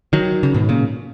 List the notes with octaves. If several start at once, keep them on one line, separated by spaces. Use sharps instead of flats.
D#3 F#3
C#3
G#2 B2
A#2 C#3